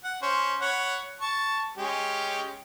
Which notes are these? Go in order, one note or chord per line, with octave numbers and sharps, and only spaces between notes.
F#5
C#4 C5 C#5
C#5 F#5 B5
A5 C#6
G#3 C#4 G4